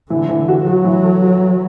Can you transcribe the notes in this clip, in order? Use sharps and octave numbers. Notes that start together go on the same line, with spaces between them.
D3 E3
E3
F#4
F#3 F#4
E3
A4
F#4